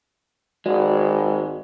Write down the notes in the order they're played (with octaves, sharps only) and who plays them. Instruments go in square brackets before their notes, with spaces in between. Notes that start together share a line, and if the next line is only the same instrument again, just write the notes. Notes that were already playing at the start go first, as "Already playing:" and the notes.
[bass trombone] G#1 [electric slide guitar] G#3 [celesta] F#4 D5